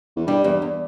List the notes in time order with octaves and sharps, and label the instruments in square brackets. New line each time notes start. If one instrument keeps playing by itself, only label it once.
[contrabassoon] E2
[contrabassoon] G2 [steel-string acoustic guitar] G3
[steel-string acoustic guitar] E2 [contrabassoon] G2
[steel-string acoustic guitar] E2